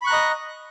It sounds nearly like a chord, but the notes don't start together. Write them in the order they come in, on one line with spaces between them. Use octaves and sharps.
B5 C#6 F#6 A#5 D#5